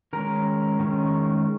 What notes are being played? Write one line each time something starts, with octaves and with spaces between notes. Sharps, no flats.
D#3 G#3 C#4 A#4
D#3 G#3 C#4